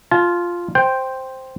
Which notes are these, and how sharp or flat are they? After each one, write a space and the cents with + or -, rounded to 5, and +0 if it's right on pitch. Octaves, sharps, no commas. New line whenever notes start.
F4 +0 A5 -35
C5 +5 G5 +0